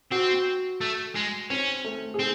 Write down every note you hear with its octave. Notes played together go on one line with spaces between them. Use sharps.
C4 F#4
A3
G#3
C4 C#4
A3
G#4
C4